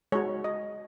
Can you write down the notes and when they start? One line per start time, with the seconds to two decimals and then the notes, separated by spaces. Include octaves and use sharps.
0.12 G#3 F#4 C#5
0.44 D#5